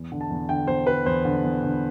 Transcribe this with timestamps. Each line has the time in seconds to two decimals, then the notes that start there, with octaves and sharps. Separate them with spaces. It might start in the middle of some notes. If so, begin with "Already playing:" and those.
Already playing: E2
0.12 D3
0.21 A5
0.30 E2
0.49 D3 G5
0.67 E2 C5
0.87 D3 B4
1.05 E2 C5
1.25 D3
1.44 E2
1.63 D3